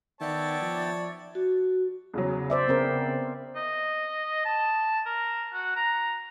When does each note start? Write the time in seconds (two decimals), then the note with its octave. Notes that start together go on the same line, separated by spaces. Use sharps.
0.21 D#3 B3 C#5 D5 E5 G5 A5
0.62 F3
1.35 F#4
2.14 E2 C#3 F#3
2.50 C5 D5 E5
2.68 C#3 B3 C4 A#4
3.56 D#5
4.45 A5
5.06 A#4
5.53 F#4
5.76 A#5